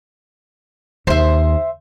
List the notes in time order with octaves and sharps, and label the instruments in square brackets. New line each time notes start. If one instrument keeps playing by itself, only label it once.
[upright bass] D#2 [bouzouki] C5 E5